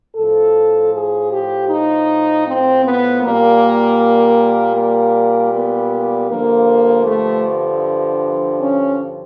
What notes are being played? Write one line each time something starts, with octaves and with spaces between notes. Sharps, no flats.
A2 F3 A4
G#4
G4
D#4
C4
B3
A#2 G3 A#3
A#3
B3
G2 D3 F3 A#3
A3
C#4